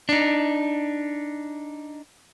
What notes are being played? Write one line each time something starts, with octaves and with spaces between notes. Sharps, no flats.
D4 D#4